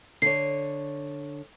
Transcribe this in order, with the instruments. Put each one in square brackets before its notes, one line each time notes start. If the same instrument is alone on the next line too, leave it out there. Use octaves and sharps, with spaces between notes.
[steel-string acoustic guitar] D3 C#5 [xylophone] C7